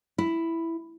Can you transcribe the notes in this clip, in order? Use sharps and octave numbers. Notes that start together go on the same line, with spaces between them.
E4